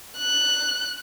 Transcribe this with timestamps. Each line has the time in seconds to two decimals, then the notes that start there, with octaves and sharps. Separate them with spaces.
0.17 F#6